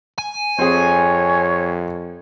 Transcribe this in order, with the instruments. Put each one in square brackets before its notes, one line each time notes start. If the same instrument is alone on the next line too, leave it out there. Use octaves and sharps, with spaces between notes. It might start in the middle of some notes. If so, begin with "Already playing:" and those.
[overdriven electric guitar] G#5
[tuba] F2 [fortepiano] C4 G#4 [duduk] C#5